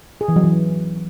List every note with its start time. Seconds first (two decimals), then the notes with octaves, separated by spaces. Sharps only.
0.21 G#4
0.28 E3
0.36 F#3
0.44 E3